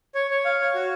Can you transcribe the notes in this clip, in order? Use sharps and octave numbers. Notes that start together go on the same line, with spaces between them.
C#5
C#5
F5
C#5
F#4